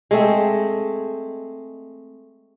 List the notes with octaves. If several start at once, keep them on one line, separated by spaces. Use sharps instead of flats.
G#3 A3 C4